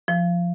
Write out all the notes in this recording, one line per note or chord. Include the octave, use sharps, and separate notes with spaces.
F3